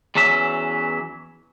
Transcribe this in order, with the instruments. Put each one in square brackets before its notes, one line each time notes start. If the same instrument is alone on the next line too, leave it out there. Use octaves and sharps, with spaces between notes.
[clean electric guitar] E2 E3 F#3 C#4 E5